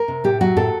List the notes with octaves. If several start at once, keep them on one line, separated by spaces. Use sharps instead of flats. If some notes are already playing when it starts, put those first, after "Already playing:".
Already playing: A#4
C3
A2 G4
F#3 F#4
A2 A4